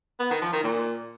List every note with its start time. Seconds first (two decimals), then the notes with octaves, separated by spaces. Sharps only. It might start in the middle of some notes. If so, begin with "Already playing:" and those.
0.20 B3
0.31 D#3
0.42 F3
0.53 D#3
0.64 A#2